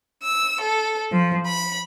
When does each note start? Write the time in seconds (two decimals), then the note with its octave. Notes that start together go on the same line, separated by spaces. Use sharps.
0.23 E6
0.62 A4
1.12 F3
1.47 B5